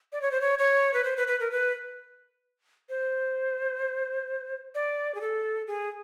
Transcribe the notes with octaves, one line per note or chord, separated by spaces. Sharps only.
D5
C#5
C5
C#5
C#5
B4
C5
B4
B4
A#4
B4
C5
D5
G#4
A4
G#4